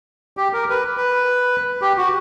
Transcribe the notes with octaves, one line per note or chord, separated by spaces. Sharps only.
G4
A#4
B4
B4
G4
F#4